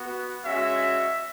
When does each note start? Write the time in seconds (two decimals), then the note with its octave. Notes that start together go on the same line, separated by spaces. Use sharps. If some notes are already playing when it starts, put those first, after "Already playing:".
Already playing: B3 F#4
0.45 G#3 C#4 F#4 E5